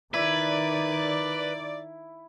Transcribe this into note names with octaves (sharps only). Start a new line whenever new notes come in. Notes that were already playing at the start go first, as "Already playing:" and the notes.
D#3 E4 B4 D5